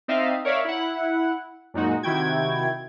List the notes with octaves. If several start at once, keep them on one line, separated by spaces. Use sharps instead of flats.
C4 D#4 D5 E5 F5
A#4 C#5 D5 E5 F5
E4 F#5
F#2 A#2 G#3 D#4 F#4
C3 D#3 E4 F#4 G5 G#6